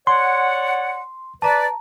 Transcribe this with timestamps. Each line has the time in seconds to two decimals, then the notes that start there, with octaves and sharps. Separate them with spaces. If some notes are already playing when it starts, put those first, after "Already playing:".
0.07 C#5 D5 F#5 C6
1.42 B4 D5 A5 A#5